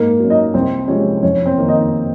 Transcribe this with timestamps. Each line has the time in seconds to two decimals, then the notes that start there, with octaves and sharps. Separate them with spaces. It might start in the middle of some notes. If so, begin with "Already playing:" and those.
Already playing: G#2 A#3 A#4
0.20 F#3 C#4
0.30 D#4 D#5
0.54 C2 C4 C5
0.88 C3 F3 G#3 C#4 C#5
1.22 F2 C#4 C#5
1.46 C4 C5
1.58 D#3 A#3
1.68 D#4 D#5